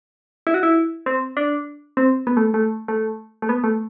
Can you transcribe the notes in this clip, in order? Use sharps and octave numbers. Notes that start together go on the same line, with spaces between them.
E4
F#4
E4
C4
D4
C4
B3
A3
A3
A3
A3
B3
A3